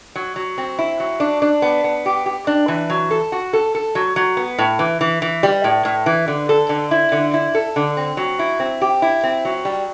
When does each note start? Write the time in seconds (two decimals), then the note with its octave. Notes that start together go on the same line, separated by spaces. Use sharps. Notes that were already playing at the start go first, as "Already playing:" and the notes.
0.16 F#3
0.36 F#3
0.58 C4
0.79 E4
1.00 F#3
1.20 D4
1.42 D4
1.62 B3
1.84 B3
2.06 G4
2.26 G4
2.47 D4
2.68 E3
2.90 F#3
3.11 A4
3.32 F#4
3.53 A4
3.75 A4
3.95 F#3
4.16 F#3
4.37 B3
4.58 A2
4.79 E3
5.01 E3
5.22 E3
5.43 G3
5.64 A2
5.85 A2
6.06 E3
6.28 D3
6.49 A4
6.69 D3
6.91 E4
7.12 D3
7.34 E4
7.55 A4
7.76 D3
7.97 C4
8.17 F#3
8.39 E4
8.60 C4
8.81 G4
9.02 E4
9.23 C4
9.45 F#3
9.65 G3